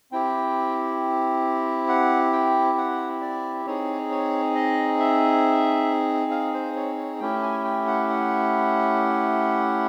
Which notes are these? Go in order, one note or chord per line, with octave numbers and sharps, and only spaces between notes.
C4 E4 G4 G5
F#5
G5
F#5
D5
C4 D#4 G#4 C#5
C#5
D#5
E5
F5
C5
C#5
C#5
A3 C#4 E4 G4 G5
G#5
G5
F#5
F#5